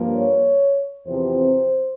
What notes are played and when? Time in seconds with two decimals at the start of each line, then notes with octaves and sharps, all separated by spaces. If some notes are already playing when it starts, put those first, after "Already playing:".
Already playing: G2 F3 A#3
0.14 C#5
1.07 E2 C3 F3 C4 C5